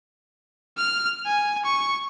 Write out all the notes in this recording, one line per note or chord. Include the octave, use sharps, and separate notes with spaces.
F6
G#5
C#6